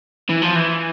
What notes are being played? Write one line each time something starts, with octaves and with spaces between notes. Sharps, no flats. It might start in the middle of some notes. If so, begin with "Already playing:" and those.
E3
F3
E3